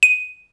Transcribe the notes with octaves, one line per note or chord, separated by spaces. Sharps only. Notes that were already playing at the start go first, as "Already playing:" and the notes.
D#7